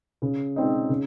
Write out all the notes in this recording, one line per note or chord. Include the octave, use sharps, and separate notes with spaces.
C#3
G#3 C4 D#4
C#3